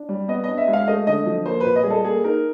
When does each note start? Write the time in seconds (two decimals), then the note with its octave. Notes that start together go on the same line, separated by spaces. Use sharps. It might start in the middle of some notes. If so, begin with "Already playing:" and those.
Already playing: D4
0.09 G3
0.28 B3 D#5
0.44 D4 D#5
0.58 E5
0.68 G#3
0.73 F5
0.88 A3 D#5
1.07 D3 D#5
1.26 F3
1.46 A#3 C5
1.60 B4
1.65 A#2
1.76 D#5
1.83 G3 G#4
1.91 A4
2.04 A#3 G#4
2.24 D#4 A#4